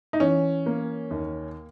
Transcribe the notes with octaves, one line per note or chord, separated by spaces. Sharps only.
D#4
E3 C#4
A#3
D#2